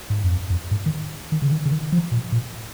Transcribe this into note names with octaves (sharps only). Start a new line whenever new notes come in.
G#2
F2
F2
G#2
D#3
D#3
C#3
D#3
C#3
D#3
F3
A#2
A#2